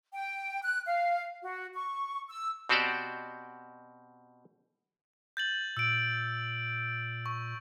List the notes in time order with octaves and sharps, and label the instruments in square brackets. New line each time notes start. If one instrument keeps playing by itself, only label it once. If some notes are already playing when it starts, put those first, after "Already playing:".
[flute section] G5
F#6
F5
F#4
C#6
E6
[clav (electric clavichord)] B2 C4 F#4 G4 C5 D5
[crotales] G6 A6 F#7
[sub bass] A#2 [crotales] E6 D7
[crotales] C#6